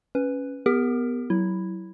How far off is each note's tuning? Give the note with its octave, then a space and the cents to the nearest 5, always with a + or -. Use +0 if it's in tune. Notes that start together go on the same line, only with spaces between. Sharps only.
C#4 +0 B4 +5
B3 +0 G4 +30 A#4 +0
F#3 +20 E4 +0